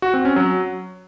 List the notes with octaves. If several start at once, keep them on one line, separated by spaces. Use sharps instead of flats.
F#4
C4
C#4
F#3